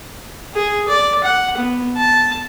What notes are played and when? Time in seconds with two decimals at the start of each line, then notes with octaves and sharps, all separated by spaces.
0.55 G#4
0.88 D5
1.24 F#5
1.58 B3
1.97 A5